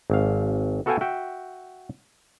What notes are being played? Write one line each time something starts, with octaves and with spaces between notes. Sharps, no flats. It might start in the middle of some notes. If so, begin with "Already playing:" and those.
G#1 F5
B3 F#4 A4 F5 G5 G#5
F#4 E5 G5